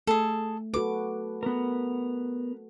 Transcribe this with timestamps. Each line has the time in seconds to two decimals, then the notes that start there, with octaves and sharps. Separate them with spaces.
0.07 A3 G#4 A4
0.74 F#4 A4 B4 D6
1.43 B3 A#4